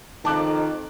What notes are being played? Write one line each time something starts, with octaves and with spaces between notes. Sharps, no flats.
F2 D#3 A5 D6 F#6